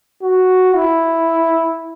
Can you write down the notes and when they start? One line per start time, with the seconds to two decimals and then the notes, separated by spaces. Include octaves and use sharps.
0.22 F#4
0.76 E4